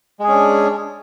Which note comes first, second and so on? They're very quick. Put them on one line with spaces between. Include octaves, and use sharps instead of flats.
G#3 G#4 C#4 D4